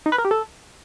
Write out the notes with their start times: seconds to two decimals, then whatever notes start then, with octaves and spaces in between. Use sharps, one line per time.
0.06 D#4
0.12 B4
0.18 A#4
0.25 G4
0.31 A4